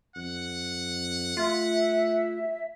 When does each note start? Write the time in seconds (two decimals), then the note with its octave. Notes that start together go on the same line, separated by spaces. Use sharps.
0.16 F2 F#5
1.37 A3 F4 E5